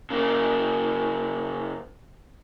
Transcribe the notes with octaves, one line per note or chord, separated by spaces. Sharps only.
C#3 A#3